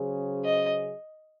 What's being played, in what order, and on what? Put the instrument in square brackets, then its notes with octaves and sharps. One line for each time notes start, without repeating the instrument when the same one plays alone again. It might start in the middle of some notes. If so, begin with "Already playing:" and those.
Already playing: [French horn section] C#3 F#3 C#4 G#4 C5
[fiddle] D#5